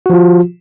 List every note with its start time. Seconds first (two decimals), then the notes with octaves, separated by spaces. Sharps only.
0.06 F#4
0.10 F3
0.13 F4